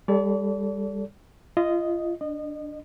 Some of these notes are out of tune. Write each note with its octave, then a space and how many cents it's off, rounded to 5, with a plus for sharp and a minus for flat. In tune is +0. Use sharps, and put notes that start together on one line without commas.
G3 +30 A4 +0 D5 -40
F4 -30 D#5 +0
D4 +0 D#5 -30